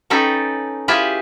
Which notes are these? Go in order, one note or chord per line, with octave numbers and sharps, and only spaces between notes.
C#4 D#4 A4 B4 G5
E4 F4 G4 G#4 B4 E5